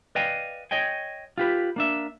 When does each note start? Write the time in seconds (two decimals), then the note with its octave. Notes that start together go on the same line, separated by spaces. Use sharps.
0.15 B4 D5 D#5 F5 G5 G#5
0.71 C#5 D#5 G5 G#5
1.38 F4 G4 B4
1.76 A#3 D4 E5